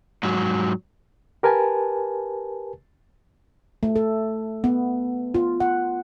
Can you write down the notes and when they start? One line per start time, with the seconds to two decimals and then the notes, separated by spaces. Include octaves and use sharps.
0.23 G#2 F#3
1.43 G4 A#4 B4 G#5 A5
3.83 A3
3.96 A4
4.64 B3
5.34 F4
5.60 F#5